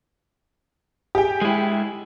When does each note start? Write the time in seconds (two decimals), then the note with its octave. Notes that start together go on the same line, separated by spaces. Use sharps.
1.15 G4 G#4 G5
1.42 G#3 E4